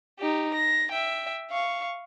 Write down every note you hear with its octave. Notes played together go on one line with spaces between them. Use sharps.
D#4 G4
A#6
E5 G5
F5 C#6